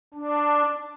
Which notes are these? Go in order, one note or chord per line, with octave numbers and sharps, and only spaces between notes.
D4